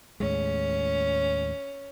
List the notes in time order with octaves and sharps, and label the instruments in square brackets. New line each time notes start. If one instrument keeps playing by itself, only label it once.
[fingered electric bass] D#2 A2 G#3 [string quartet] C#4